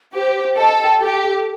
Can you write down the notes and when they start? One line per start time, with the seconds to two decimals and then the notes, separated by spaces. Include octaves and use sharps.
0.14 G4 C5
0.35 C5
0.57 A4 D#5
0.79 G5
1.01 G4 A4
1.23 A4